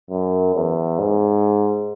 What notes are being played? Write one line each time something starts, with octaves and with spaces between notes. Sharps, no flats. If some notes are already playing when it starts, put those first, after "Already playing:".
F#2
E2
G#2